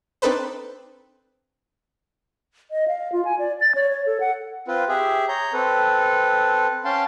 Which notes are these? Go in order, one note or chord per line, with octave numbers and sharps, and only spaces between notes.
C4 D4 D#4 A4 B4 C5
D#5
F5
F4
G#5
D5
A6
C#5
C#5
A4
F#5
C4 F4 B4
G4 G#4 E5
C#5 A#5 G6
C4 A4 B4
C#4 F5 G5 A5 C6